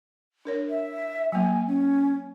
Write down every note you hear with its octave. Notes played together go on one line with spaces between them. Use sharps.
D4 A#4 C#5
E5
F#3 A#3 G#5
C#4